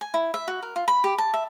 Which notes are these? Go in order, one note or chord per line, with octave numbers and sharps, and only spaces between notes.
G#5
E4
E5
F#4
A#4
F4
B5
G4
A5
E5